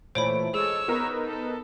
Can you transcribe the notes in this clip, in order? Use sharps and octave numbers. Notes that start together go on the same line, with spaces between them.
A#2 E3 A3 C5 C#5 B5 D7
G#3 G#4 A4 C#5 E6
B3 D#4 A#4 B4
A4